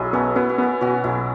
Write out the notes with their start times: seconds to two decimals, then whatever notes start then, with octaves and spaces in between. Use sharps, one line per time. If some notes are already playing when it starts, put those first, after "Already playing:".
Already playing: B1 E4 G#4
0.13 B3 C#4 F#4
0.36 B3 E4
0.49 F#4
0.58 B3 E4
0.81 B2 C#4 F#4
1.04 B1 E4